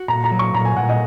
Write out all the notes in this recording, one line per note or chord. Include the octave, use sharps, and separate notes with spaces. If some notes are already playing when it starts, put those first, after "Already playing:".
Already playing: F#4
A#2 A#5
A#5
F#3
C#6
A#2 A#5
G#5
A#2 F#5
D#5